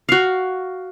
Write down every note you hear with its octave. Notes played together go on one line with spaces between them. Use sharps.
F#4 F5